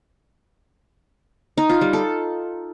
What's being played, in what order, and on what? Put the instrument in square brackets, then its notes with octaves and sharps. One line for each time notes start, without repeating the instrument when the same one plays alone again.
[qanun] D#4
F4
G3
A4